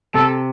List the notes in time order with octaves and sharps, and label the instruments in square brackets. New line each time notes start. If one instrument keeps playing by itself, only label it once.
[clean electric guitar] C3 [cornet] A4